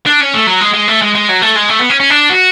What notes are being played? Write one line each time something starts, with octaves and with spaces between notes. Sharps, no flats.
D4
C#4
A3
F#3
G#3
G#3
A3
G#3
G#3
F#3
A3
G#3
A3
B3
C#4
C#4
D4
F#4